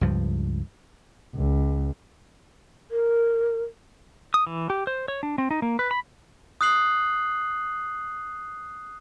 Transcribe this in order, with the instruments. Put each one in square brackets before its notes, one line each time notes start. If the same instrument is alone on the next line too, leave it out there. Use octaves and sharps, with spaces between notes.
[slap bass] C#2 G2 F3
[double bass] C#2
[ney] A#4
[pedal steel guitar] D#6
E3
G4
C5
C#5
D4
C4
D#4
A#3
B4
B5
[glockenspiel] D#6 F#6 C7 F#7